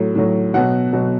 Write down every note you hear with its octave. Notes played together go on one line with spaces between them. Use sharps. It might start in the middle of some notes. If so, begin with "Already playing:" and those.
Already playing: A2 F#3
A2 F#3
B2 F#3 F#5
B2 F#3